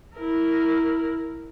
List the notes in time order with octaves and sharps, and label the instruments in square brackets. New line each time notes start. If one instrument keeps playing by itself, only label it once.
[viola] E4 A#4